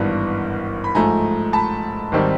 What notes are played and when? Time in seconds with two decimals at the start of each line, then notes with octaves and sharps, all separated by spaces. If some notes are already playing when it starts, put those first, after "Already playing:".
Already playing: G#1 G2 E3 G3 B3 F#5
0.84 B5
0.95 G#2 F3 A3 G#5 A#5
1.53 A5 B5
2.12 G#1 D#3 G3 C4